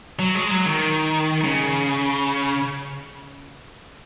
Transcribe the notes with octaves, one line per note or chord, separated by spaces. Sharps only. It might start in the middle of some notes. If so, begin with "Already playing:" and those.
F#3
G#3
F#3
D#3
C#3